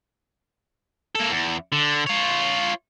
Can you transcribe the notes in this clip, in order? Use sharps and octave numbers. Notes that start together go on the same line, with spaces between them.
A#3 A4
E2
D3
F4 C#5